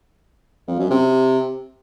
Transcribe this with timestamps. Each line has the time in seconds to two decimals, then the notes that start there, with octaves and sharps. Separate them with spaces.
0.68 F2
0.79 F#2
0.90 C3